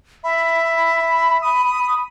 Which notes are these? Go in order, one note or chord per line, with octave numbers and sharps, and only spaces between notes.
E5 B5
D#6